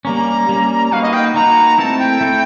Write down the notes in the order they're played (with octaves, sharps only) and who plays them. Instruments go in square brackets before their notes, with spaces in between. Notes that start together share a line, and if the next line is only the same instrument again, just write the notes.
[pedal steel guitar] G3 A#3 C#4 [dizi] A#5
[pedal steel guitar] G3 A#3 C#4
[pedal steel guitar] A#3 D#4 F#4 B4 [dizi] F5
[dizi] D#5
G5
[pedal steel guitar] A#3 D#4 F#4 B4 [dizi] A#5
[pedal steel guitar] A3 C4 E4 A4 [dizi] A5
[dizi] G5
[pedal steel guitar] A3 C4 E4 A4